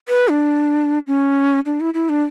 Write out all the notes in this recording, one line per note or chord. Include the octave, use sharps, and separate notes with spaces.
B4
D4
C#4
D4
E4
E4
D4